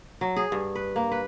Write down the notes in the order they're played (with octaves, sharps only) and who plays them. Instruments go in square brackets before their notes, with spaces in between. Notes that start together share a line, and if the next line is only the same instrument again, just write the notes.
[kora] F#3
G#4
G2
B4
A#3
B4